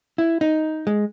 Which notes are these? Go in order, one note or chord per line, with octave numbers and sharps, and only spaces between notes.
E4
D#4
G#3